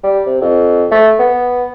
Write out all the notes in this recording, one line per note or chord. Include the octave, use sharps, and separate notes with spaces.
G3
C3
F2
A3
B3